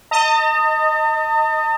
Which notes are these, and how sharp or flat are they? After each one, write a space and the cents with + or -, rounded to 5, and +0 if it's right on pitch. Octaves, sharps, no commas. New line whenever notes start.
D#5 +0 A5 +45